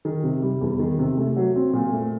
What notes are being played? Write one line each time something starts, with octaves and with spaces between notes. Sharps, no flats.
D#3
C3
G3
E2
D#3
C3
A3
F#3
C4
A#2
A3